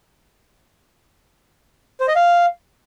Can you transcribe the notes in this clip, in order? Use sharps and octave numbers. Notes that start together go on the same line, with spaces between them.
C5
D#5
F5